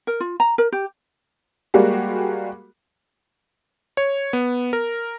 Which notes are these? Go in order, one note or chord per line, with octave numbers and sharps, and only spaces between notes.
A#4
F4
A#5
A#4
G4
G3 G#3 A#3 F#4 G4
C#5
B3
A#4